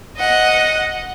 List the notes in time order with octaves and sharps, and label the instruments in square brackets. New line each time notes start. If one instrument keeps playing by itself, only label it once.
[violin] D#5 F#5